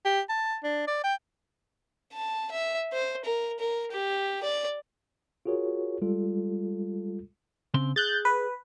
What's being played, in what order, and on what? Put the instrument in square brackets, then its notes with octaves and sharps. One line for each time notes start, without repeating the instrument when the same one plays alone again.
[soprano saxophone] G4
A5
D4
D5
G5
[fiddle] A5
E5
C5
A#4
A#4
G4
D5
[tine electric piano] F4 F#4 G#4 A#4 C#5
G3 G#3 F4 A4
[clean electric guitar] C#3 C4 C6
[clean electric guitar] G#4 [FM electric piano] F#6 G6 A6
[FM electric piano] B4